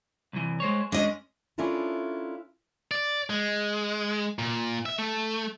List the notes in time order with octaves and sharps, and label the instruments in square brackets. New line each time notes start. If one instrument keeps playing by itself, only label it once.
[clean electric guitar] C2 E3
G#3 C5 C#5
[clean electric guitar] G#3 C#4 [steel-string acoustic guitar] D4 D#5
[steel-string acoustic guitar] C#4 D4 E4 F4 A4 A#4
[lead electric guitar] D5
G#3
A#2
E5
A3